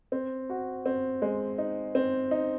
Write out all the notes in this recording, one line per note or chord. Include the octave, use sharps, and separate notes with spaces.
C4
F#4
C4
G#3
D#4
C4
D#4